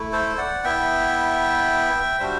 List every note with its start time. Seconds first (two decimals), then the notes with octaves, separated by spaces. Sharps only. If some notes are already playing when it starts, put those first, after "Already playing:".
Already playing: A3 E4
0.13 A4 C5
0.38 D5 F#5
0.64 B3 E4 E5 G5
2.19 G3 D4 F#4 C5 E5